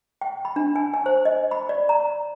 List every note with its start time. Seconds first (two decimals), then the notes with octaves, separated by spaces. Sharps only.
0.21 G5
0.45 B5
0.56 D4
0.76 G#5
0.94 G#5
1.06 C5
1.25 D#5
1.51 B5
1.69 D5
1.89 A#5